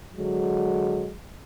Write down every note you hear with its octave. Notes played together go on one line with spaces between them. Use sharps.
D3 F#3 G#3